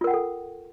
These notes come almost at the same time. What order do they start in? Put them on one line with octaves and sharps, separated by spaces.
F4 A#4 F#5 G5 A4